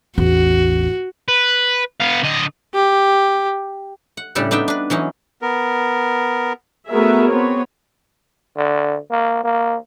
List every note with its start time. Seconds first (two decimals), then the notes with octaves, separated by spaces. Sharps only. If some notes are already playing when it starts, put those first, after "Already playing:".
0.18 A1 E2 F#4
1.28 B4
2.00 B3 F5
2.23 D3 D#5
2.74 G4
4.17 F#5
4.35 A2 C#3 G3 D4 G4 A4
4.51 B3 D4 D#4 E5 G5
4.68 D4 B4
4.90 E3 F#3 C#4 D#4
5.42 B3 A#4
6.88 A3 B3 F#4 G#4 A#4 E5
7.30 B3 C4 C#5
8.56 D3
9.11 A#3
9.44 A#3